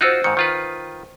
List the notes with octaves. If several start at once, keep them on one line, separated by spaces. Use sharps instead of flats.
D#4 F4 F#4 C5 E6 F#6
G#2 D#3 C#7
D#3 F4 B4